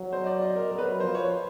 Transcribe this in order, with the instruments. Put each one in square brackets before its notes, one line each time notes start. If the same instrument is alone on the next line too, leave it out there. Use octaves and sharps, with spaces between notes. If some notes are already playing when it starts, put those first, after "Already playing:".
Already playing: [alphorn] F#3
[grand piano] C5
D#5
D5
D#5
A#4
[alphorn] F#3 [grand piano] A#4
[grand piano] B4
A#4
[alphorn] F3 [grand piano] C5
[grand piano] C#5